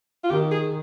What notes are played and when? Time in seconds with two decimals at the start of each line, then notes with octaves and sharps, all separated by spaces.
0.24 F4
0.30 D#3 G4
0.51 G#4